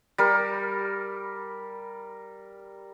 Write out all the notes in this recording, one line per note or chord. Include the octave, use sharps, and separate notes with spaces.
G3 A#4